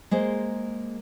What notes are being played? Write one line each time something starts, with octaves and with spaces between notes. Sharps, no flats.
G#3 A#3 C5